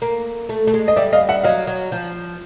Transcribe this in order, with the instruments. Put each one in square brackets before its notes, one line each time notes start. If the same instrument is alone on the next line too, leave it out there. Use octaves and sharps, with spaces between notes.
[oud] A#3
A3
A3
G#3
[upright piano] D#5
[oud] G3 [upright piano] D5 E5
[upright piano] D#5 F5
E5 F#5
[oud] F#3 [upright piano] D#5 F5
[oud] F#3
F3